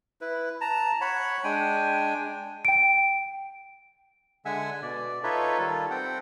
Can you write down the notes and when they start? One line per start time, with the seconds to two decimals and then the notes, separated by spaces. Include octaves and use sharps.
0.21 E4 B4
0.61 A5 A#5
1.01 C#5 F#5 B5
1.44 G#3 D4 G5 G#5
2.65 G5 D7
4.45 D3 G#3 E5 F#5 G#5 E6
4.82 B2 D5
5.24 D#4 F4 A4 B4 C#5 E5
5.59 D#3 G3 F4 A4
5.91 C4 F#5 G5